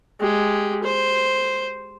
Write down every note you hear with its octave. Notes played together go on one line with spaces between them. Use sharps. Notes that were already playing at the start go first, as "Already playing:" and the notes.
G#3 G4
C5